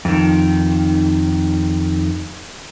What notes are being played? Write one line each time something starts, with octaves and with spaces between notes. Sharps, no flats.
F2 D#3